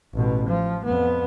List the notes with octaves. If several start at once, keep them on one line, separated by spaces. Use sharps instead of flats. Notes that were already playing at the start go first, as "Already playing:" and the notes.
A1 B2
F3
F2 B3